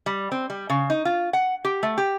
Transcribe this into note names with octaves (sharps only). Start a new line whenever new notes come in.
G3
C4
G3
C#3
D#4
F4
F#5
G4
A3
G4